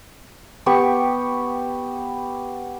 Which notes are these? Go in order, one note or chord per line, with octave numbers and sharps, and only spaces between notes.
B3 G4 G5 C#6